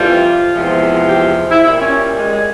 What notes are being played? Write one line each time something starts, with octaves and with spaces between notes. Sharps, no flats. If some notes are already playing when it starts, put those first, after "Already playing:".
Already playing: F2 C3 E3 G3 F4
E2 C3 F3 G#3
G4
E4
A#2 G3 E4
C#4
G#3
G#3